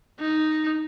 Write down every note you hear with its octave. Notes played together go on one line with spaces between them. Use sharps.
D#4